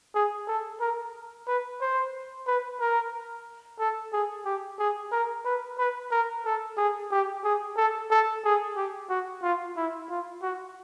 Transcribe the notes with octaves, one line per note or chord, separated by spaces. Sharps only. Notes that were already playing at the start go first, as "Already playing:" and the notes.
G#4
A4
A#4
B4
C5
B4
A#4
A4
G#4
G4
G#4
A#4
B4
B4
A#4
A4
G#4
G4
G#4
A4
A4
G#4
G4
F#4
F4
E4
F4
F#4